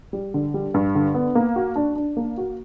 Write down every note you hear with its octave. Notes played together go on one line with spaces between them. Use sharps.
G3
D3
G3
G2
D3
B3
A#3
F#4
D4
D4
A#3
F#4